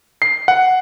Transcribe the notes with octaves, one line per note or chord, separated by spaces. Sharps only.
C7
F#5